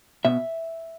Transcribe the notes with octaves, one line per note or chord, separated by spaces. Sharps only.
B2 E5